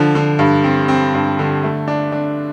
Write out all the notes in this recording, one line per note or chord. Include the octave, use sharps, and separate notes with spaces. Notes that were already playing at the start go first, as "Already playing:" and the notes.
Already playing: D3 F3
D3
G2
C4
C4
G2
D3
A3
D4
D4